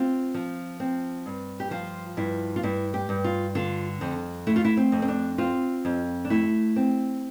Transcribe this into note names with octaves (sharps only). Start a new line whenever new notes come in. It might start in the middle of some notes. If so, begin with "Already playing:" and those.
Already playing: C4 F4
F3
C4
G2
G4
F3 F4
G2 E4
F4
G2 E4
G4
G2
F4
D3 F4
F2
A3 E4
F4
E4
C4
F2
C4
D4
C4 F4
F2
D4
A3 E4
C4